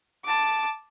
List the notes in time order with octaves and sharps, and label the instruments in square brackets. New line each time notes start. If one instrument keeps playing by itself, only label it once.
[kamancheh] A5 D6